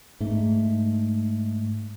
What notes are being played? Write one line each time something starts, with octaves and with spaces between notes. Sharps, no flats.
G#2 A3